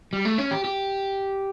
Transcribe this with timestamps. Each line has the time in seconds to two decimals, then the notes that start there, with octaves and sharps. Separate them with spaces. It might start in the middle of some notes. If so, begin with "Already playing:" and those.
0.13 G3
0.25 A3
0.38 C#4
0.51 G4
0.64 G4